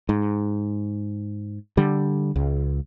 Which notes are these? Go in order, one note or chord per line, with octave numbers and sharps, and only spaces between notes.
G#2
D3 G3
C#2